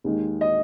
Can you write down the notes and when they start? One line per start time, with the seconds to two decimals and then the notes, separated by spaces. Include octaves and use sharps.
0.04 D#2 D#3 G#3
0.41 D#5